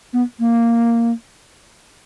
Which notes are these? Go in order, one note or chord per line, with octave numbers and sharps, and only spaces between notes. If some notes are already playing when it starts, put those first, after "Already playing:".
B3
A#3